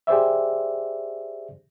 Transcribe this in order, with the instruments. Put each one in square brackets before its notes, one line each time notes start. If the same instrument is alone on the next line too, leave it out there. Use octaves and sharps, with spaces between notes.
[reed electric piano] G4 G#4 C5 D5 E5